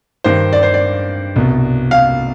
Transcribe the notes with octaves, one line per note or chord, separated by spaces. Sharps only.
G2 D#3 C5
D5
C5
D5
C2 B2
F5